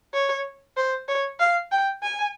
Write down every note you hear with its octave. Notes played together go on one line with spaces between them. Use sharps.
C#5
C5
C#5
F5
G5
G#5